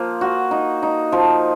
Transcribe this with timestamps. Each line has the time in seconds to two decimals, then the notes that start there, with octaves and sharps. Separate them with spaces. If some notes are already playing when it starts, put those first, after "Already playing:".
Already playing: F3 A#3
0.21 F#4
0.51 D#4
0.83 D#4
1.12 F3